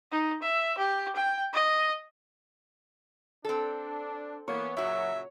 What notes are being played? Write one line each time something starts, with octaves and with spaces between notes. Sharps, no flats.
D#4
E5
G4
G5
D#5
C4 D4 A4
E3 A#3 B3 C#5
F#2 A#2 C#3 F#3 F#4 E5